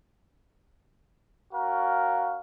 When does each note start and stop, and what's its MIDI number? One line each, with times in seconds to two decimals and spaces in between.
1.53 2.40 61
1.53 2.40 66
1.53 2.40 70
1.53 2.40 77